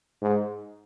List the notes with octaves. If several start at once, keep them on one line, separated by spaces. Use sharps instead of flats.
G#2